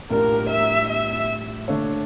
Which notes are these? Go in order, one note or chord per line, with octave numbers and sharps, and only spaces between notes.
A2 G3 D4 F4 A#4
E5
E5
D3 A3 D4 A4 C#5